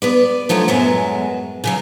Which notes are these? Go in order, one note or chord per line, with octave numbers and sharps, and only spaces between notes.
B3 B4 D5
D3 F3 F#3 A3 B3
F#2 A2 F#3 G#3 B3
C#3 E3 F#3